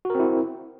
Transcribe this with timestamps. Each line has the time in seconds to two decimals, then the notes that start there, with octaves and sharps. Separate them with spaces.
0.05 F#4
0.10 A#4
0.15 C4
0.19 E4